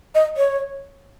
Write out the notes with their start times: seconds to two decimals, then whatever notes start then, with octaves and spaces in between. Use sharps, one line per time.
0.15 D#5
0.37 C#5